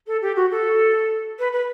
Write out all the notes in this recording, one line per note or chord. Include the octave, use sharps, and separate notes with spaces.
A4
G4
F#4
A4
B4
B4